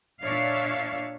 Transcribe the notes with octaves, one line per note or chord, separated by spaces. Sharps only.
A#2 D4 C#5 E5 F5